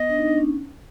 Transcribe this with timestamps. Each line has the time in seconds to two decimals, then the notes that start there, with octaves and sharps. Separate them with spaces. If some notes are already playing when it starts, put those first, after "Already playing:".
Already playing: B3 D#5
0.09 D4
0.18 D#4
0.28 D4
0.38 C#4